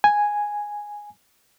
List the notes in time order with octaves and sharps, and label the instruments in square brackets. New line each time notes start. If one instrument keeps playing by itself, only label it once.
[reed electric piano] G#5